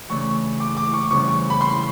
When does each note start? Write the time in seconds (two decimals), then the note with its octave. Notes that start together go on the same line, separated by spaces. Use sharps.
0.09 C#3 E3 A3 D4 C#6
0.60 D6
0.77 D6
0.94 C#6
1.11 E2 C#3 E3 G3 C4 C#6
1.50 B5
1.61 C6